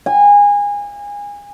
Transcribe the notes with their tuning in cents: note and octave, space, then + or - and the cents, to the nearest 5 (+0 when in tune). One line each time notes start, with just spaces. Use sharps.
G#5 -25